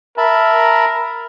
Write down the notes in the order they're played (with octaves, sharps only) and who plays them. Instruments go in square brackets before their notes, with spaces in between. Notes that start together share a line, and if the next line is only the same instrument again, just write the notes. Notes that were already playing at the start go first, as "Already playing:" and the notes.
[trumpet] A#4 [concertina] E5 A5 B5